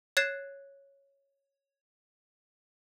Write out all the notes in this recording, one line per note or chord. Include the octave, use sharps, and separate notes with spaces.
C#5 F#6 G#6 A6 C7 E7